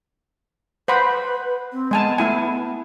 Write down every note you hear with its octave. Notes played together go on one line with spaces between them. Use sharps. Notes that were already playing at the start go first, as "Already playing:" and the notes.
B4 C5 F#5 B5
C4
G#3 B3 G#5 A5
A3 E4 G#5